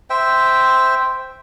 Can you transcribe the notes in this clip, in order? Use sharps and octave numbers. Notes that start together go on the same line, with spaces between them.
C5 E5 G5